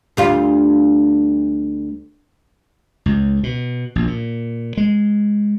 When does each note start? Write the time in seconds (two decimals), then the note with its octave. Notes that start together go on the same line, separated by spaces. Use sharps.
0.17 D2 G3 F4
3.06 C#2
3.43 B2
3.96 A#1
4.07 A#2
4.77 G#3